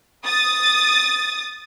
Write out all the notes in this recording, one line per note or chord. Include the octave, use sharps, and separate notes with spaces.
D#6 A6